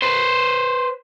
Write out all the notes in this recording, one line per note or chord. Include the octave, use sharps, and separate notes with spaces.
B4 C5